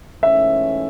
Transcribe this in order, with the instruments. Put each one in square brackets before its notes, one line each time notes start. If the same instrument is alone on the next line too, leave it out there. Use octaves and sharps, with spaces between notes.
[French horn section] G#2 E3 A3 C#4 [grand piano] E5